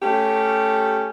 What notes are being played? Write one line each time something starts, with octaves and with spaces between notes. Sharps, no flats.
A3 C#4 G4